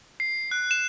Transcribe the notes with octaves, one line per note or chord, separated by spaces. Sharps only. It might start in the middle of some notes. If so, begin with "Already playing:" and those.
C7
F#6
E7